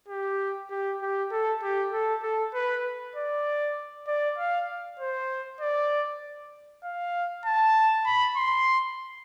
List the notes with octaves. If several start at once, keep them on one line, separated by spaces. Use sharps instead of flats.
G4
G4
G4
A4
G4
A4
A4
B4
D5
D5
F5
C5
D5
F5
A5
B5
C6